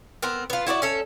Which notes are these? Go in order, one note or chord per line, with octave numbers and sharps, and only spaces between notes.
B3 C4 A#4
B3 F4
E4 F#4 B4 D5
C#4 A4